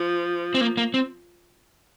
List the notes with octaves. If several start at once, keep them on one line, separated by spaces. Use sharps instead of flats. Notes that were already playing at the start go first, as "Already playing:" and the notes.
Already playing: F3
C4
A#3
A#3
C4